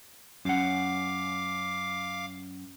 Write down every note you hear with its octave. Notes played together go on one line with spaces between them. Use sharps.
F#2 C#4 F5 F#5 D6